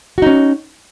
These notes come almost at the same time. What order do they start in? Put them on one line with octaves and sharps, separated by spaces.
F#4 D#4 C#4